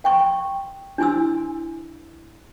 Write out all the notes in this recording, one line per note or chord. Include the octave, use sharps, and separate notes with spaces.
F5 G5 C6 C#6
D4 E4 G#5 C6 E6